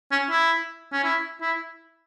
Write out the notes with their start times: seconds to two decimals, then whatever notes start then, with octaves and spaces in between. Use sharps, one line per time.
0.11 C#4
0.30 E4
0.92 C#4
1.04 E4
1.41 E4